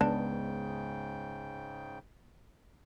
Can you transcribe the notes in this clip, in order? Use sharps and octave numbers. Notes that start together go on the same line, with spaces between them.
C#2 G#2 C#3 B3 D4 G5